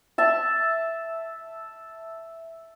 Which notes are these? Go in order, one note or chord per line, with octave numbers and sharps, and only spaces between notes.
E5 A5